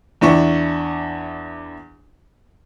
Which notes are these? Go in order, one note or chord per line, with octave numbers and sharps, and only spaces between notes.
E2 D4 E4 C#6